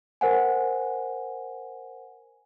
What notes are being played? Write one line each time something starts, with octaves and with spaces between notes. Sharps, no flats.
A#4 C5 F#5 G#5